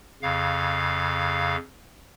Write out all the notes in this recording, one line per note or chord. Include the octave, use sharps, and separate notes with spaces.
F2 C#3 F5